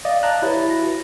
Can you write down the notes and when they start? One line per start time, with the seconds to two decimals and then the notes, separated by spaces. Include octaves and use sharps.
0.05 D5 D#5 F5
0.23 A5 A#5 F#6
0.42 E4 G4 B4 C#5 A6
0.69 F#4 A#6